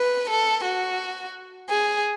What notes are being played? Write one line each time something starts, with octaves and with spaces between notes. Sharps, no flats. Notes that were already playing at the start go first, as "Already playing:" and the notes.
Already playing: B4
A4
F#4
G#4